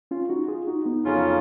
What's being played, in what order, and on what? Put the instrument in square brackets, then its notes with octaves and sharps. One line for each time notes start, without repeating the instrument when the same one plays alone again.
[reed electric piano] C#4 F4
D#4 F#4
F4 G#4
D#4 F#4
B3 D#4
[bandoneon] F2 C#3 F#3 C#4 F4